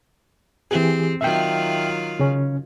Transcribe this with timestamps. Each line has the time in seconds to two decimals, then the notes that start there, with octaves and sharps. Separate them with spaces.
0.71 E3 C4 G4 G#4
1.21 D#3 F#3 F4 E5 G5
2.20 C#3 C#4